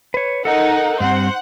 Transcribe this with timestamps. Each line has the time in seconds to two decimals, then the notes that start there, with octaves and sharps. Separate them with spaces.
0.14 B4 C#5
0.45 D#4 A4 A#4 D#5 F#5
1.00 G2 G3 C4 C5 F#5